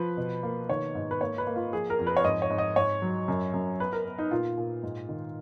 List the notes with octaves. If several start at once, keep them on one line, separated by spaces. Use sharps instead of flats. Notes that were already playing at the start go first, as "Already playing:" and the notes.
Already playing: F3 B4
B2
A#3
D#3 C#5
G#2
B4
A#3 C#5
B4
A#3
F4
F3 G#4
A#4
F2
B4
C#5
G#2 D#5
C#5
G#2
D#5
G#2 C#5
F#3
F#2
F#2
B3 B4
A#4
B3
D#4
A#2 F4
A#2
G#2
D#3